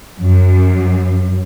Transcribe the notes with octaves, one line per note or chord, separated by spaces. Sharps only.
F#2